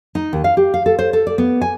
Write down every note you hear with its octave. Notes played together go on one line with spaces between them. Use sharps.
D#4
D#2
F5
G4
F5
A4
C5
A4
D5
B3
G#5